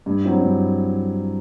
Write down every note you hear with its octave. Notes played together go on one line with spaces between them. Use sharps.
G2
F#3 C4 E4
G2